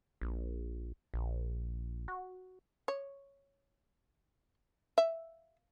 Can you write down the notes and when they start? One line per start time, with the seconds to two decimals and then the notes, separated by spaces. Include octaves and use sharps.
0.21 A#1
1.14 A#1
2.08 F#4
2.88 C#5
4.98 E5